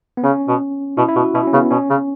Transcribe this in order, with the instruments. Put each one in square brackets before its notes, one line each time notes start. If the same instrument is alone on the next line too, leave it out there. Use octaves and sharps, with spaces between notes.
[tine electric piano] B3
[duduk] C#3 [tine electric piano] C#4
[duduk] B2
[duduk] B2 [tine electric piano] E4
[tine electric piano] E4
[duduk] B2 [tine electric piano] F#4
[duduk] B2 [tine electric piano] E4
[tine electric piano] C#4
[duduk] C#3 [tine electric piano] B3
[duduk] B2 [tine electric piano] C#4
[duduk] C#3